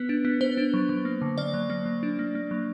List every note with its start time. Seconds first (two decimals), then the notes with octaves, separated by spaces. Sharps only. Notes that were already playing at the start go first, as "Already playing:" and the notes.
Already playing: B3 B4
0.09 D4
0.25 B3
0.41 B3 C5
0.57 D4
0.74 F#3
0.89 F#3
1.05 A#3
1.22 D3
1.38 A#3 D5
1.54 F#3
1.70 A#3
1.86 F#3
2.03 D4
2.19 A#3
2.35 A#3
2.51 F#3